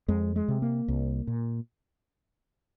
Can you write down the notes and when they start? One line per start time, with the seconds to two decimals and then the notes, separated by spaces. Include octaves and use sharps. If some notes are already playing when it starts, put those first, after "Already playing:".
0.08 F2 G#3
0.36 G#3
0.48 C3
0.62 A#3
0.88 C2
1.27 A#2